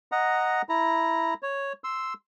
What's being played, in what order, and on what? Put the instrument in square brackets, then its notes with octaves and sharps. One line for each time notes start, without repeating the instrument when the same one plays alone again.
[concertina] D#5 F#5 A#5
E4 A#5
C#5
C6 E6